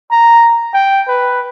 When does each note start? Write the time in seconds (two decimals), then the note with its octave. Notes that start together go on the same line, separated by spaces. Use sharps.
0.11 A#5
0.74 G5
1.08 B4